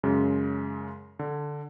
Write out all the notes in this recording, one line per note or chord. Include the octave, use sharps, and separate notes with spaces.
F#2 C#3 G#3
D3